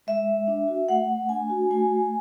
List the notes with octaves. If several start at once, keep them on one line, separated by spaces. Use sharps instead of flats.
G#3 E5
G#3
D4
F#4
A3 F#5
A3
D4 G#5
F#4
A3 G#5
A3